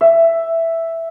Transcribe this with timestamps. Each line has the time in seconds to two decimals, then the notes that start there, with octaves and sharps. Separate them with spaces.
0.01 E5